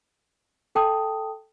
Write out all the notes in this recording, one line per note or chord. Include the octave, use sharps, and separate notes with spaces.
A4 G5 A5 D#6